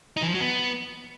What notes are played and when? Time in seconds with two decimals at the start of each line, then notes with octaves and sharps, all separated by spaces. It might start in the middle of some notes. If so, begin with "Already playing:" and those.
0.17 D#4
0.23 E3
0.29 F3
0.35 F#3
0.41 B3